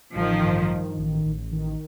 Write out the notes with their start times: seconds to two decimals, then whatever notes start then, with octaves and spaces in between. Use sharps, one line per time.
0.14 A1 D#3 F3
0.42 G2
0.70 D#3
0.97 A1
1.25 A1
1.51 D#3